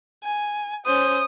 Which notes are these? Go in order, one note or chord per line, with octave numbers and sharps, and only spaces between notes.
G#5
C#4 C5 D#6